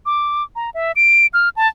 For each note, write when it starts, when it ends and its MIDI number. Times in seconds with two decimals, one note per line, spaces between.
0.06 0.43 86
0.56 0.70 82
0.74 0.92 76
0.96 1.27 98
1.34 1.49 89
1.56 1.68 81